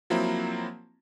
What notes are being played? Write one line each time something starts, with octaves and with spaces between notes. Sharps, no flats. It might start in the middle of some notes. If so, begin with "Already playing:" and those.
F3 F#3 A#3 C4 E4